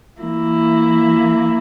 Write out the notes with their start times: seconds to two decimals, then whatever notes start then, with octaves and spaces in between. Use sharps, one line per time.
0.20 E3 A#3 E4